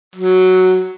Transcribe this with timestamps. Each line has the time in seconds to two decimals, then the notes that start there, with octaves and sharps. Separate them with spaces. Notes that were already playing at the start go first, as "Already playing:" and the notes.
0.16 F#3